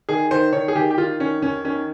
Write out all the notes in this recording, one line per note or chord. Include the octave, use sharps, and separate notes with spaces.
D#3 G#4
D#3 C5
D#3 C#5
G#4
D#3 G4
G4
D#3 F4
D#3 C#4
D#2 C#4
D#3 C#4